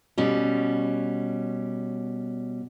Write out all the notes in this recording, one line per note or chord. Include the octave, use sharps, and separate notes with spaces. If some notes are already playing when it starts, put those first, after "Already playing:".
B2 G3 C#4